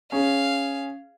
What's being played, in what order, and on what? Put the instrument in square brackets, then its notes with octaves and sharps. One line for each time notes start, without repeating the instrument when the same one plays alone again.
[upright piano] C#4 G#4 [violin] F5